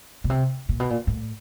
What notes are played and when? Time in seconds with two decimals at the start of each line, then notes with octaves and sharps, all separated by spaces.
0.24 B2
0.30 C3
0.69 A#2
0.80 B2
0.90 A#2
1.07 A2